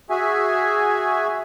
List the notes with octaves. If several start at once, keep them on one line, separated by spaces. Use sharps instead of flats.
F#4 G#4 E5 G#5